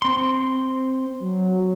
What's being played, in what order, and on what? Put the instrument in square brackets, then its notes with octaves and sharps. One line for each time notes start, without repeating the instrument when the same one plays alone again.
[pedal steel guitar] C4 C6
[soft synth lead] F#3